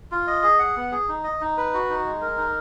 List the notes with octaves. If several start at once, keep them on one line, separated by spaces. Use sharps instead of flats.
F4
D#5
G#4
F#5
B3
G#4
D#4
D#5
D#4
B4
F#4
D#4
G#3
A#4
D#4